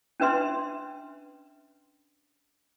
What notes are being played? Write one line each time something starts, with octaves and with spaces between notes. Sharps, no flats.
C#4 D4 B4 E5 C6